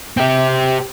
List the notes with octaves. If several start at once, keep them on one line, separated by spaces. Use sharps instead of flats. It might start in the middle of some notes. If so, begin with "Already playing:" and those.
C4 G4